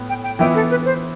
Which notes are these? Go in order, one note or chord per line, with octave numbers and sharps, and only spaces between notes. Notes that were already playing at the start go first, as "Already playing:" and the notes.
Already playing: A2 B3
G5
G5
E3 B3 E4 G5
A4
B4
C5